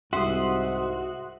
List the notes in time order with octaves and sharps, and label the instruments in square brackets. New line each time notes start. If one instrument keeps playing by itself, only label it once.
[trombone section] C2 G#2 [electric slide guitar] F#4 [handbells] E5 [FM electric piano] C6 D#6